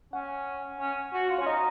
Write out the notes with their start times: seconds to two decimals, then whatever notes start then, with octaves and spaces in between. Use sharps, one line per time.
0.13 C#4 F#5
0.80 C#4
1.13 F#4
1.30 F4
1.38 C#4 C#5
1.46 D#4 D#5